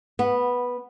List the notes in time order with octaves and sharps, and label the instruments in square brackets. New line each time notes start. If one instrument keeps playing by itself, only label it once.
[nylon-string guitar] B3